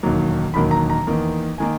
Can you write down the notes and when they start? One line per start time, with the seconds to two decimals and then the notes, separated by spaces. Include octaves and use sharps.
0.03 E1 D#2 D#3 F#3 A#3
0.54 E1 D#2 D#3 F#3 A#3 B5
0.71 A#5
0.90 A#5
1.07 E2 D#3 A#3
1.58 D#3 A#3 G#5